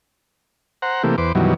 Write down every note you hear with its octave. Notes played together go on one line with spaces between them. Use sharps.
C5 F#5 A#5
C3 E3 A3 A#3 G4
E2 B4 C5 D6
F#2 B2 D#3 E3 F#3 G3